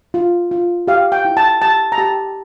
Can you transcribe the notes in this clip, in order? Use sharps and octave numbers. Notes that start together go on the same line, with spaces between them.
F4
F4
G4 F5
G5
E4
A5
G4 A5
A#5
G4 A5